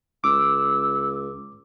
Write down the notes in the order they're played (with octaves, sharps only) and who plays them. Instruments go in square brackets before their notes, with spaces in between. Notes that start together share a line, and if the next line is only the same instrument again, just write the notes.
[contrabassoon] C#2 [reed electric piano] D6 [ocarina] E6